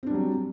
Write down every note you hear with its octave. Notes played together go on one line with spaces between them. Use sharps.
F#3 G3 C4 D4